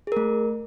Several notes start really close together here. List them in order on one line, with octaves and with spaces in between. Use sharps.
G#4 A#4 A3